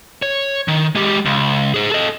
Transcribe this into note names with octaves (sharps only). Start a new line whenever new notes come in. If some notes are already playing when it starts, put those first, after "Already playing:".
C#5
D#3
G#3 G4
C#2
G#4 C5
A4 D#5